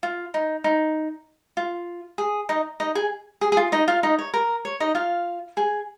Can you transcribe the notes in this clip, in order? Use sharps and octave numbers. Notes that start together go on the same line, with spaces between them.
F4
D#4
D#4
F4
G#4
D#4 D#5
D#4 D#5
G#4 G#5
G#4
G#4
F4
D#4 D#5
F4 F5
D#4 D#5
C#5
A#4
C#5
D#4 D#5
F4 F5
G#4 G#5